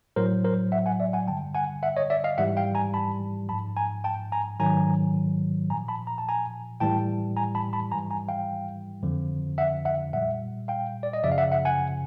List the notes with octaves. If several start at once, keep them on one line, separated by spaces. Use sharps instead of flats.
A2 F#3 A#4 C5
A#4 C5
E5 F#5
F#5 G#5
D5 E5
F#5 G#5
G2 D3 G3 G5 A5
F#5 G#5
E5 F#5
C#5 D#5
D5 E5
D#5 F5
G#2 E3 G3 E5 F#5
F5 G5
G#5 A#5
A5 B5
G#2 F3 A5 B5
G#5 A#5
G5 A5
G#5 A#5
G#2 D#3 F#3 G#5 A#5
A#2 F3 G#5 A#5
A5 B5
A#5
A5
G#5 A#5
A2 E3 G3 G5 A5
G#5 A#5
A5 B5
A5 B5
G#2 E3 G3 G#5 A#5
G#5 A#5
F5 G5
F2 D3 F3
E5 F#5
E5 F#5
A#2 G3 E5 F#5
F5 G5
D5
D#5
F#2 C#3 F3 D5 E5
F5
E5 F#5
E5 F#5
F#5 G#5